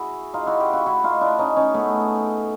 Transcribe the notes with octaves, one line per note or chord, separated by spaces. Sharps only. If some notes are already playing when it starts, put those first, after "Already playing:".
Already playing: E4 F#4 G#4
D#4 F4
E4 F#4
F4 G4
E4 F#4
E4 F#4
D#4 F4
D4 E4
C#4 D#4
C#4 D#4
A3 B3